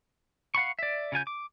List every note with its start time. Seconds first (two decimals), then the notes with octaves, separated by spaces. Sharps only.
0.55 F5 F#5 B5 C#6
0.79 D5 E5
1.12 C#3 F4 G#5 G6
1.27 D6